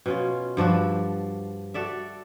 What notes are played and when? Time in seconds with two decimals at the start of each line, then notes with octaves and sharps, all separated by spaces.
0.06 B2 C#4 F4
0.57 G2 F3 D4 F#4
1.74 F#4 A4 D5 E5